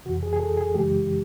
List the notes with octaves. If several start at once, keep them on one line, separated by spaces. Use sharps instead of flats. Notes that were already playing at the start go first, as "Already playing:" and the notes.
F2 C3 E3 F#4
G#4
G#4
A4
G#4
F#2 C#3 E3 G#3 G4